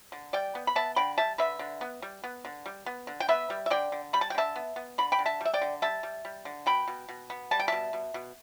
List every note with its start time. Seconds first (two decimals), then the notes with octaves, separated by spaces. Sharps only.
0.12 D3
0.33 G3 D5 G5
0.55 B3
0.67 B5
0.75 B3 E5 A5
0.96 D3 G5 B5
1.18 G3 E5 A5
1.38 D3 B4 E5
1.59 D3
1.81 B3
2.02 G3
2.24 B3
2.45 D3
2.66 G3
2.86 B3
3.07 D3
3.20 G5
3.29 B3 B4 E5
3.50 G3
3.66 E5
3.70 D3 D5 G5
3.92 D3
4.13 G3 B5
4.21 A5
4.30 G5
4.34 D3 E5 A5
4.56 B3
4.76 B3
4.98 D3 B5
5.12 G5 B5
5.19 D3
5.26 E5 A5
5.41 G3 E5
5.54 D5 G5
5.61 D3
5.82 G3 E5 A5
6.03 G3
6.25 G3
6.45 D3
6.66 B2 G5 B5
6.88 B2
7.09 B2
7.30 B3
7.51 G3 A5
7.59 G5
7.68 B2 E5 A5
7.93 B2
8.14 B2